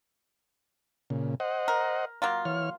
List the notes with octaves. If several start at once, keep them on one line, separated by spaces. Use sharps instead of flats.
A#2 C#3
C5 D#5 F#5
A#4
F#3 A#3 F4
E3 C#5 F6